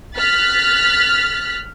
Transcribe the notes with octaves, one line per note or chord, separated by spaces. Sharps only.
F6 F#6 A6 B6